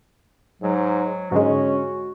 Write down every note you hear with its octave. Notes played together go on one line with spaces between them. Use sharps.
G#2 F#3
G#2 D3 G#3 C#4 F#4